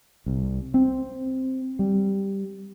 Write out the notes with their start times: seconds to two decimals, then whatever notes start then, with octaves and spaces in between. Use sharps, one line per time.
0.26 C2
0.74 C4
1.79 G3